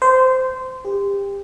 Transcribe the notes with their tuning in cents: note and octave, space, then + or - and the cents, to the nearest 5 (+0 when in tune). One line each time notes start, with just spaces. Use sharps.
C5 -15
G4 +30